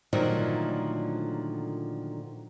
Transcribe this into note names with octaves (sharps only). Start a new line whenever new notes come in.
A#2 D3 D#3 F3 F#3 A3